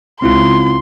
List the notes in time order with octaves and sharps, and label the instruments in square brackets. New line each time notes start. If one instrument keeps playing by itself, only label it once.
[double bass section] C#2 [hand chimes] C4 E4 F4 [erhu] C6